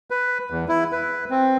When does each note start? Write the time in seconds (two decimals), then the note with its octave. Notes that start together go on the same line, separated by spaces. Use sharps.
0.10 B4
0.51 E2
0.68 E4
0.92 B4
1.30 C4